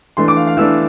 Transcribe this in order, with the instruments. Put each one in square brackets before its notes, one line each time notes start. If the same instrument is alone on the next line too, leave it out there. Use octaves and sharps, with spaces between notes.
[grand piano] E3 A3 D4 C6
D6
F5
F5
E3 A3 D4 E6